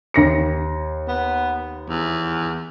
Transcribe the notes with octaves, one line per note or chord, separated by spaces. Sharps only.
D#2 A#6 C#7
B3
E2